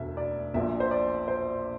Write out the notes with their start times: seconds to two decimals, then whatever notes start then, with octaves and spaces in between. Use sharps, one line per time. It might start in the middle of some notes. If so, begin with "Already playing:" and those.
Already playing: E1 D2 E5
0.17 D5
0.54 A#1 A#2 E5
0.80 C5
0.91 D5
1.28 C5